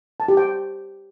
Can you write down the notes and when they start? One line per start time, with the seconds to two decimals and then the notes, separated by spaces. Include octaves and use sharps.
0.20 A5
0.28 G4
0.37 G5